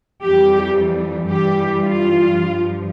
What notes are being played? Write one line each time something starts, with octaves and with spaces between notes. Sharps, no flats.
F2 E3 G3 G4
G2 E3 G3 G4
F4
G2 F3